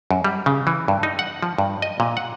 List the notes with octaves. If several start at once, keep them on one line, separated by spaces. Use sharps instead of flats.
F#2
G3
C#3
E3
G2
D#4
F#5
F3
G2
D#5
A#2
F#5